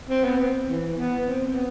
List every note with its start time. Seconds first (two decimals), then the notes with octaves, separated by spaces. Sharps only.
0.09 C4
0.24 B3
0.37 C4
0.67 E3
0.96 B3
1.26 C4
1.46 C4
1.55 B3